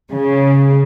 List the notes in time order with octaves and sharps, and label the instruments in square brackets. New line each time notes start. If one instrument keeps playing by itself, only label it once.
[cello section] C#3